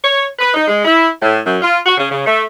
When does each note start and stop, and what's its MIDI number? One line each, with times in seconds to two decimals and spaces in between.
0.03 0.26 73
0.39 0.54 71
0.54 0.65 63
0.68 0.82 56
0.85 1.09 64
1.22 1.39 45
1.46 1.57 42
1.62 1.79 65
1.86 1.94 66
1.98 2.09 49
2.11 2.26 49
2.26 2.43 57